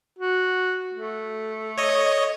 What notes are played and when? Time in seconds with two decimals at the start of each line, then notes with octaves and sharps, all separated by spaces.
0.19 F#4
0.94 A3
1.78 C#5 D#5